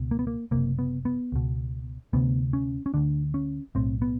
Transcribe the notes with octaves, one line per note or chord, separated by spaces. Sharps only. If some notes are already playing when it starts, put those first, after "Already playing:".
Already playing: C#2 B2
A#3
B3
A#3
F#1 F2 C3 A#3
B3
B3
C#2 B2
D2 C3 B3
C#4
C#4
D2 D3 D4
C#4
B1 A2 C4
B3